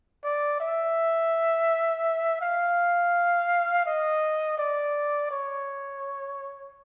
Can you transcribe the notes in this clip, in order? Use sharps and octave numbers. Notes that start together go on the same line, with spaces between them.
D5
E5
F5
D#5
D5
C#5